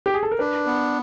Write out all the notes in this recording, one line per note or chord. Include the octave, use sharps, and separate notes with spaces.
G4
G#4
A4
A#4
D4 B4
B3